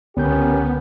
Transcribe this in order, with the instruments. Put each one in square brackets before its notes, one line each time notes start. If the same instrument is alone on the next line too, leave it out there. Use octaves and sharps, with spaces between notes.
[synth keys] C#2 D3 G6 [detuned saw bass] B3 [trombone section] C#4 G4 A#4